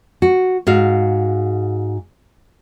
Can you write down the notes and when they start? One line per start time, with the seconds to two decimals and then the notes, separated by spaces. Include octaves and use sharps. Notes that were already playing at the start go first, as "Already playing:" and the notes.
0.22 F#4
0.67 G#2 F#4 F5